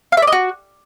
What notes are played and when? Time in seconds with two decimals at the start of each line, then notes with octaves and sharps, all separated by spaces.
0.12 F5
0.17 E5
0.22 D5
0.27 D#5
0.32 F#4